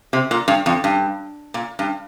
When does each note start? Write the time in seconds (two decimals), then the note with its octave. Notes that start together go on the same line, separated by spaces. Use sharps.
0.13 C3
0.31 A#2
0.48 G2
0.66 F2
0.84 G2
1.54 A#2
1.79 G2